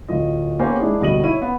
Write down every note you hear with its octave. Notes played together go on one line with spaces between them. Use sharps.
D1 F4 D#5
A#3 B3 C#4 G4 C5 G#5
G#3 D4 E4 G#4
D1 G2 B2 D#5 D#7 F#7
E4 C#5 D#7
B3